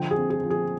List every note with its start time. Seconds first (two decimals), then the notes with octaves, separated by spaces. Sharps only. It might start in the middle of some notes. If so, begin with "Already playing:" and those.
Already playing: D3 F3 G5
0.11 G#4
0.17 C4
0.30 G#4
0.43 F3
0.50 G#4